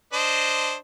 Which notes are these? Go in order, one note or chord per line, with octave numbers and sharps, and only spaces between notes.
D4 C5 D#5